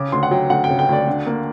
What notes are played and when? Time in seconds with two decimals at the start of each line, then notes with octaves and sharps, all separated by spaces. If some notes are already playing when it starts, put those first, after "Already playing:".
Already playing: C#3 D6
0.12 D2 C6
0.23 F#5
0.31 F#3 G5
0.50 D2 F#5
0.64 G5
0.70 C#3
0.79 G5
0.89 D2 D5
1.07 D3
1.26 A#3